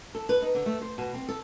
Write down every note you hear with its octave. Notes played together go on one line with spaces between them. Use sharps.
A4
B4
D#4
D3
A3
C5
B2
C4
A4